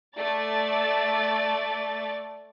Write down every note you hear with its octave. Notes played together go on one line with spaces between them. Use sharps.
A3 D5 A6